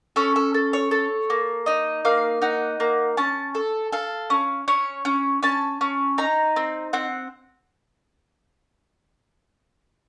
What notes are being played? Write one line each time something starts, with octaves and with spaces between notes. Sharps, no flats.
C#4 A4
A4
A4
C#5
A4
A#3
D#4 D#5
A#3 F5
D#4 F#5
A#3
C#4 A5
A4
A4 F5
C#4
C#4 C#5
C#4
C#4 A5
C#4
D#4 A#5
C4
C4 F#5